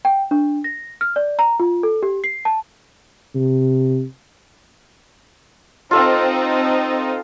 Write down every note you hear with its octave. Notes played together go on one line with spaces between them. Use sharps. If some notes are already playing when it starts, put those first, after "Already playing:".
G5
D4
A#6
F6
D5
A#5
F4
A4
G4
C7
A5
C3
C4 D#4 F4 A4 F5